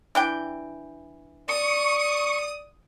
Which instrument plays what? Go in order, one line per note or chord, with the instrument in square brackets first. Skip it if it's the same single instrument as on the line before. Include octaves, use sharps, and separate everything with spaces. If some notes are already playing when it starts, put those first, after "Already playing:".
[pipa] E3 D4 G5
[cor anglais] D5 [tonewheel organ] C#6 [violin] D#6